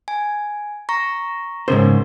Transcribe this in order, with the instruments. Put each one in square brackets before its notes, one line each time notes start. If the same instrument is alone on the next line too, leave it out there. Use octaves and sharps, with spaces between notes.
[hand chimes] G#5
A#5 C#6 A#6
[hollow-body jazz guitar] G#2 C#3 C5 [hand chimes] B3 C#4 A#4